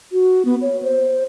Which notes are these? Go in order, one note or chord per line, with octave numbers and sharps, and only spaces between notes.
F#4
B3
C#5
C5